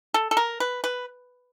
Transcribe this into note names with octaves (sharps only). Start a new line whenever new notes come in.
A4
A4
A#4
B4
B4